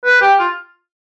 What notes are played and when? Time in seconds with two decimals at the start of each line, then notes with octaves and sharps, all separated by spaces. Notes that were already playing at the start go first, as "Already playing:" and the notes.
0.05 B4
0.21 G4
0.40 F4